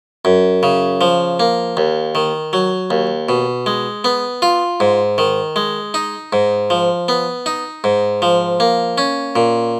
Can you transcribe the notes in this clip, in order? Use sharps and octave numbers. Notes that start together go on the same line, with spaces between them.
F#2
C#3
F3
A#3
D#2
D#3
F#3
D#2
B2
G#3
B3
F4
G#2
D#3
G#3
D#4
G#2
F3
B3
D#4
G#2
F3
A#3
C#4
A#2